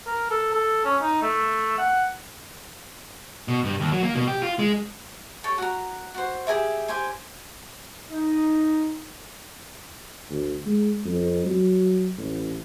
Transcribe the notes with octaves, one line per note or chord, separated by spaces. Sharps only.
A#4
A4
A4
C#4
D#4
A3
F#5
B2
G2
D#2
F#3
A#3
B2
G4
F4
G#3
G4 A4 C#5
F#4 A#5
F#4 C5
G4 G#4 A#4 E5
G4 C5 G#5
D#4
D2
G#3
F2
F#3
A1